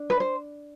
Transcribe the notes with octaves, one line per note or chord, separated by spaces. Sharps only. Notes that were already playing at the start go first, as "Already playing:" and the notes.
Already playing: D4
B4
C5